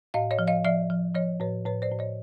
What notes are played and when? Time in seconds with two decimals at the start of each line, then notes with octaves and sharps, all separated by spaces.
0.14 A2 D#5 F5
0.31 C#5 D#5
0.39 F3
0.47 D#5 F5
0.65 F3 D5 E5
0.90 F3
1.15 F3 C#5 D#5
1.40 A2 B4 C#5
1.66 A2 B4 C#5
1.82 C5 D5
1.91 A2
1.99 C#5 D#5